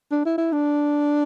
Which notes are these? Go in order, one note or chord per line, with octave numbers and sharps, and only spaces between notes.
D4
E4
E4
D4